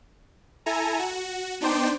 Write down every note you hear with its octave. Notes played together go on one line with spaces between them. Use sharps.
E4 A4 G#5 A#5
F#4
B3 D4 D#4 C5 D5 G5